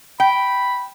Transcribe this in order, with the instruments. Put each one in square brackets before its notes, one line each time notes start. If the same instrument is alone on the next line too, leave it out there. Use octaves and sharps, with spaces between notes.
[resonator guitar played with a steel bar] G5 [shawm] B5